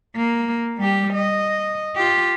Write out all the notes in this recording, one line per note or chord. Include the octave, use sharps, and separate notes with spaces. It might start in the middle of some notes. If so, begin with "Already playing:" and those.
A#3
G3 G4
D#5
F4 G4